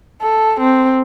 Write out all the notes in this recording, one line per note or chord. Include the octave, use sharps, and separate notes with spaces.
A4
C4